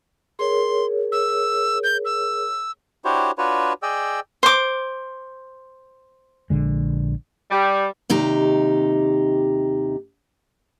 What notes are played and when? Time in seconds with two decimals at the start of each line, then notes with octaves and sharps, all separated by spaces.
0.39 G#4 A#4 C#5 C6
1.12 E6
1.84 G6
2.05 E6
3.05 D4 E4 F#4 G4 C5 C#5
3.38 D4 F4 F#4 B4 C#5
3.83 G#4 D5 D#5 G5 E6
4.43 C5 D6
6.50 A#1 D3 G#3
7.50 G3
8.10 D#2 C3 D#4 G4